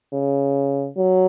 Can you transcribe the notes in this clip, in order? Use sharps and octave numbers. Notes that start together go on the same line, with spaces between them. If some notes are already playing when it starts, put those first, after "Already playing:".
C#3
F#3